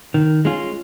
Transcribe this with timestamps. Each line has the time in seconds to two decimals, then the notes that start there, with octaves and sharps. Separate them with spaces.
0.14 D#3
0.45 G#3 C#4 F4